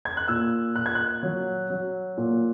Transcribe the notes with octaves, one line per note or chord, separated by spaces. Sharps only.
G#6
F#6
A#2 E6
A#2 F#6
G#6
F#6
F#3
F#3
A#2